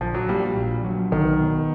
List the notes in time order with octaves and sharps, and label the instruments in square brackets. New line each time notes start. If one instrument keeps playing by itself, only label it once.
[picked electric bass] A#1 [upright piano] F3
[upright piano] F#3
[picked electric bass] A#2 [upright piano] G3
[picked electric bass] A#1
F#3
[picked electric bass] B1 [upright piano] D#3
[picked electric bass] B2